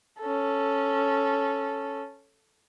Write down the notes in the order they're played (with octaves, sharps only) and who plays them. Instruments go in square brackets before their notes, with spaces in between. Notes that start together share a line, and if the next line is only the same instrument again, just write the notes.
[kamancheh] C#4 A4